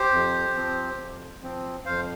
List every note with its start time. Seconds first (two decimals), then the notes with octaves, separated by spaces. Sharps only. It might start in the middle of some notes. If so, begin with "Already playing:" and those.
Already playing: G4 C5
0.11 F2
0.55 F3 C4
0.98 F2
1.42 F3 C4
1.85 F2 C5 F5